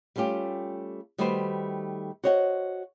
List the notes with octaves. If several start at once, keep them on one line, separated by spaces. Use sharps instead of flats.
G3 A3 C#4 F4 G4
D#3 G3 A3 F#4 B4 C5
F#4 C5 C#5 D#5 F#5